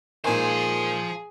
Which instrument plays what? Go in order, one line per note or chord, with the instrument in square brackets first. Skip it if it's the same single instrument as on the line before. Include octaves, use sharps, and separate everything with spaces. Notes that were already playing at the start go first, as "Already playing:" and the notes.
[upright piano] A#2 G#5 [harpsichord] D#3 G#3 [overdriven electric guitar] F3 C5 [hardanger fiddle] G#4